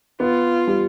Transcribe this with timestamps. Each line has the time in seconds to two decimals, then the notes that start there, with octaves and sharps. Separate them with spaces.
0.20 B3 F4
0.68 G3